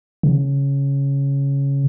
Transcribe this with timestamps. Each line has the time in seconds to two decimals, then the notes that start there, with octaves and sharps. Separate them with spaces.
0.23 C#3